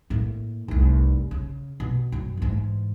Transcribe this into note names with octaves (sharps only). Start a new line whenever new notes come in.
A2 A#3
F1 C2
C#3
B2
F#2
G#2 E3